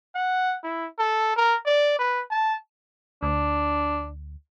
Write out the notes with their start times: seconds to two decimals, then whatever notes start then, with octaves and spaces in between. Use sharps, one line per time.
0.15 F#5
0.63 E4
0.99 A4
1.36 A#4
1.65 D5
1.99 B4
2.30 A5
3.23 D2 D4